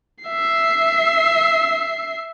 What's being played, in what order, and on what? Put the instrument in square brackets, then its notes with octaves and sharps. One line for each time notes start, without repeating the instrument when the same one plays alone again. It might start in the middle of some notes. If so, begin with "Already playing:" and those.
[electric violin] E5 C7